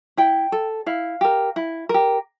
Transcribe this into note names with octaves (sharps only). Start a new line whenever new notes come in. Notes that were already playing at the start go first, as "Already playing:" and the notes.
E4 G5
A4
E4 F5
G4 A#4
E4
G4 A#4